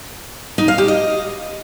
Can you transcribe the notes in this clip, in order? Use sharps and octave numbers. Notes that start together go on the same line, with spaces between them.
D#4
F5
G4
D#5